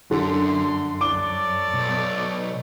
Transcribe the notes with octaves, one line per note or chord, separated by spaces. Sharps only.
F#2 D3 C6
A4 C#5 D5 D6 G7
B1